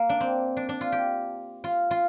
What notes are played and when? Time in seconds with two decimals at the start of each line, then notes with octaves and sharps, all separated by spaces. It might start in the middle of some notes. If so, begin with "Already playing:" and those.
Already playing: A#3
0.09 D4
0.20 C4
0.57 D4
0.69 D4
0.81 F4
0.92 G4
1.64 F4
1.91 F4